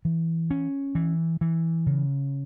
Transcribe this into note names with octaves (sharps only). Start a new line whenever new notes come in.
E3
C#4
E3
E3
C#3